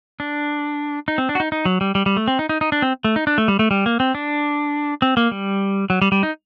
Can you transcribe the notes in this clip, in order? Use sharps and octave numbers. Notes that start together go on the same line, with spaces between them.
D4
D#4
C4
D4
F#4
D#4
D#4
F#3
G3
G3
G3
A3
C4
D#4
D#4
D#4
D4
C4
A3
D#4
D4
A3
G3
A3
G3
A#3
C4
D4
C4
A#3
G3
F#3
G3
G3
D#4